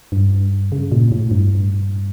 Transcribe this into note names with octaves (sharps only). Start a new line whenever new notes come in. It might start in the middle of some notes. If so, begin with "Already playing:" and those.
G2
C#3
A#2
A2
G2